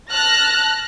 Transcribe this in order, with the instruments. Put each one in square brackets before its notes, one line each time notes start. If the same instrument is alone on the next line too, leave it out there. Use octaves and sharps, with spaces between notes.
[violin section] A5 F6 F#6 A#6